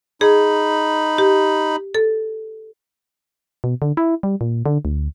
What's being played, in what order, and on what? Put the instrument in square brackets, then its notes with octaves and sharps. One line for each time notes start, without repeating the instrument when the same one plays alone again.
[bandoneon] D#4 B5 [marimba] G#4
[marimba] G4
A4
[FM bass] B2
D3
E4
G3
A#2
D3
D2